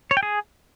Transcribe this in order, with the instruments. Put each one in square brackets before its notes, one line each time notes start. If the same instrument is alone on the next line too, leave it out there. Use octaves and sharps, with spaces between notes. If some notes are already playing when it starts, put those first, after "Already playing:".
[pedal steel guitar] C#5
G5
G#4